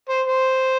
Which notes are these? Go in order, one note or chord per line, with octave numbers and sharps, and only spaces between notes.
C5
C5